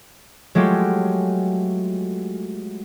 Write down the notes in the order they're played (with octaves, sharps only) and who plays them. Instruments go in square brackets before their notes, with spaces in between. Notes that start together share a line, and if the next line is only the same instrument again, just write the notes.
[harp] F#3 G#3 A3 F4 G4